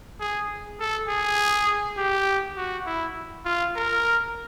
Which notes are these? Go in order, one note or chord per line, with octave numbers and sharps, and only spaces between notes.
G#4
A4
G#4
G4
F#4
E4
F4
A#4